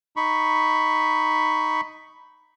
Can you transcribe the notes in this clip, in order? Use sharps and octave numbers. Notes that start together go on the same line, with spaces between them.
D#4 B5 C#6